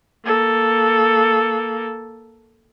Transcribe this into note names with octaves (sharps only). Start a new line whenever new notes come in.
A#3 A4